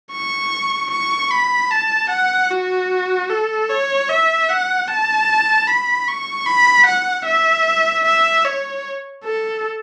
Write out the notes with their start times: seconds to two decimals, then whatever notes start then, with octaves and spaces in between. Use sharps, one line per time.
0.12 C#6
0.91 C#6
1.31 B5
1.71 A5
2.10 F#5
2.50 F#4
3.30 A4
3.69 C#5
4.09 E5
4.49 F#5
4.87 A5
5.67 B5
6.08 C#6
6.46 B5
6.86 F#5
7.26 E5
8.05 E5
8.45 C#5
9.24 A4